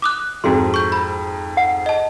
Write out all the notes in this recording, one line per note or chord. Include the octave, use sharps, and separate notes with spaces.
D6 D#6 F#6
F2 G#2 F#4 G#4 C6
C#6 G6
B5
F#5
D#5 A5